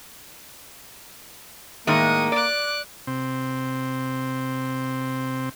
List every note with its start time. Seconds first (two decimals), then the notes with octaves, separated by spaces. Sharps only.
1.87 A2 D#3 G#3 A#3 C#6 D#6
2.32 D5 D6 F#6
3.07 C3 C4